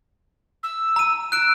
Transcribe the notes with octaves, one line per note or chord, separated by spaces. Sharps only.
E6
A#5 D#7
E6 F#6 D7